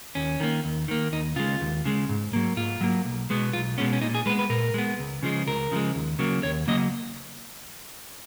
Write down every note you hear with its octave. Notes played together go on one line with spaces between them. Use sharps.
D#2 C#4
D#3 A#3
D#2
D#3 A#3
D#2 D#4
C#3 G#3 F4
D#2
C#3 G#3
G#2
F#3 A#3
G#2 F4
F#3 A#3
B1
B2 G#3 B3
B1 F4
B2 G#3 B3 C#4
C#4
A#2 D#4
G#4
G#3 B3 B4
B4
A#2 A#4
G#3 B3
C#2
C#3 F3 G#3
C#2 A#4
C#3 F3 G#3
D#2
C#3 F#3 A#3
D#2 C#5
C#3 F#3 A#3 D#5